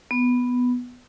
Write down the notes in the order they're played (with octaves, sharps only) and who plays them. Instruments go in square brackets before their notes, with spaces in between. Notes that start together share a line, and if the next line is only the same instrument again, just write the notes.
[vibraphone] B3